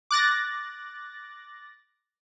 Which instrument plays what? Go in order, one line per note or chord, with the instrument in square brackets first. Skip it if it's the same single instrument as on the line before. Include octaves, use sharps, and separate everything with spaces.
[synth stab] D6 F#6 A6 A#6